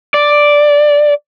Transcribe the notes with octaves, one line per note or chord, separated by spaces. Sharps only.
D5